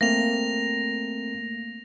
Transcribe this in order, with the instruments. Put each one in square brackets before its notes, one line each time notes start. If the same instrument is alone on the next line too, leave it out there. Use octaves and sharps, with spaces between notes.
[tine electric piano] A3 A#3 C4 [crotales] A#6 F7